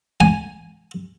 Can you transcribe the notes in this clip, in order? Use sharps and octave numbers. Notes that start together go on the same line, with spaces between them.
G#5